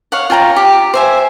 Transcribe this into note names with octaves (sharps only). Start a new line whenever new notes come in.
C#5 F5 F#5
F4 G5 G#5 A#5
G4
C5 E5 G#5